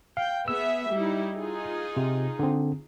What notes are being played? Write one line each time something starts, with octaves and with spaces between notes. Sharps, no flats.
F5 G5
B3 G#4 E5 E6
G3 D#4 E4
D#4 F4 G#4
C3
D3 C4